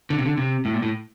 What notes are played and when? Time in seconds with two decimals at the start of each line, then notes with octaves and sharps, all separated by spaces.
0.10 D3
0.18 C3
0.25 D3
0.37 C3
0.65 A2
0.74 A#2
0.82 A2